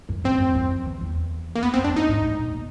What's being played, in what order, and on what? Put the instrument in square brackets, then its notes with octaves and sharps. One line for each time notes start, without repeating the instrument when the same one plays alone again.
[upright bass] F#2
[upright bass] G2 [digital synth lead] C4
[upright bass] F#2
F#2
F2
E2
E2
[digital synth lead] A#3
[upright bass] F2 [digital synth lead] B3
[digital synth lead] C4
[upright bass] F#2
[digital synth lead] D4
[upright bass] G2 [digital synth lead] D#4
[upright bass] G#2
A2
A#2
B2